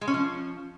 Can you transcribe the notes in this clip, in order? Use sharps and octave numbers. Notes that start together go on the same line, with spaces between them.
G#3
C#4
F3